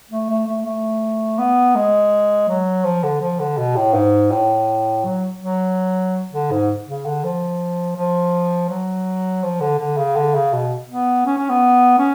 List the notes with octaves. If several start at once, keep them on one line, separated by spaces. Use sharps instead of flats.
A3
A3
A3
A3
B3
G#3
F#3
F3
D3
F3
D3
B2
A2
G#2
A2
F#3
F#3
D3
G#2
C#3
D3
F3
F3
F#3
F3
D3
D3
C#3
D3
C#3
B2
B3
C#4
C#4
B3
C#4